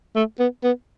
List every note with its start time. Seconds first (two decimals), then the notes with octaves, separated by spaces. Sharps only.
0.16 A3
0.40 B3
0.64 B3